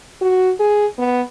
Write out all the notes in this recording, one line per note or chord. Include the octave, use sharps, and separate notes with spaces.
F#4
G#4
B3